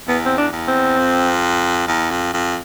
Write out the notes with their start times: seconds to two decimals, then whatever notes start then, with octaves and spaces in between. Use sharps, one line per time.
0.08 E2 B3
0.26 C4
0.38 D4
0.52 E2
0.68 C4
0.98 F2
1.88 E2
2.11 F2
2.33 F2